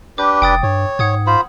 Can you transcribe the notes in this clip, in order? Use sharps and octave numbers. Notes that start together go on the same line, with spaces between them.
D4 G4 B4 D6 G6
F1 G5 D#6 A6
G2 C#5
G#2 F#5 D#6 G#6
F4 C5 B5